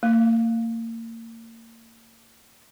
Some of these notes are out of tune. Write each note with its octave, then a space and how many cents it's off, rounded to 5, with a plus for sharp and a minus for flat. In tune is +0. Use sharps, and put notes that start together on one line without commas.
A#3 -35